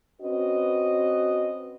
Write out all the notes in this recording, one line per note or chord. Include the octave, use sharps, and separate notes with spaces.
C4 C#4 F#4 B4 D#5